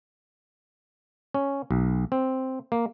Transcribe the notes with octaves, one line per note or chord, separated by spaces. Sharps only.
C#4
B1
C4
A#3